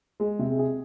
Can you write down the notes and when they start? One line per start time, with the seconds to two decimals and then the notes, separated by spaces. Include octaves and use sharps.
0.20 G#3
0.39 C3
0.59 G#4